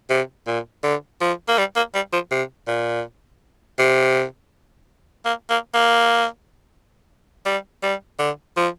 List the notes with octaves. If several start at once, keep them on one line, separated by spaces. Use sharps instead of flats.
C3
A#2
D3
F3
A#3
G3
A#3
G3
F3
C3
A#2
C3
A#3
A#3
A#3
G3
G3
D3
F3